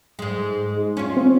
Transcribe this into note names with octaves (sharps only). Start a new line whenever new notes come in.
G#2 G#3
C#4 F4
C4